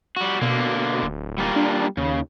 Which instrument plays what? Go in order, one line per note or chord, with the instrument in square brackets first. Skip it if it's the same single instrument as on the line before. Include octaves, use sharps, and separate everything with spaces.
[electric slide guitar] G3 F#4
[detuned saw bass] B2 [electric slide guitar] D3 A#3
[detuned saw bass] D1
[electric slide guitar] G3 A#3 F4
[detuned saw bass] D4
[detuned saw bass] D#2 [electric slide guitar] C#3